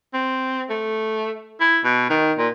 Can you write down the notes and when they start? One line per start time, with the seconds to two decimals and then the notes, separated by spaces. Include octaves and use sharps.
0.14 C4
0.70 A3
1.60 E4
1.84 B2
2.10 D#3
2.38 A#2